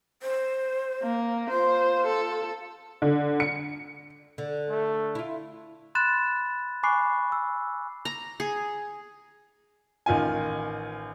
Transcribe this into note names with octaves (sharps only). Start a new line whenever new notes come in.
C5
A#3
F4 C5
A4
D3
C#7
D3
A3
E4 F4
B5 C6 F#6 A6 E7
G#5 B5 C#6 D6 F#6 C7
E6
A#5
G#4
A1 D#3 F4 G#5